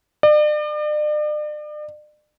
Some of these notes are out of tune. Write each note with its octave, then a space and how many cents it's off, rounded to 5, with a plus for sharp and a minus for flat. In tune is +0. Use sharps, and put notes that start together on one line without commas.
D5 +40